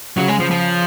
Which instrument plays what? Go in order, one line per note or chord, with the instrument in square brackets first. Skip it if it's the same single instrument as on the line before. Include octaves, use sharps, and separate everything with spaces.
[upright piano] C#3 [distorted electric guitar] F#3
[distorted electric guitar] G#3
F3
F3